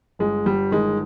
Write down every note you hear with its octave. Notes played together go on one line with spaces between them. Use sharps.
G1 G#3
G1 G3
D#3 G#3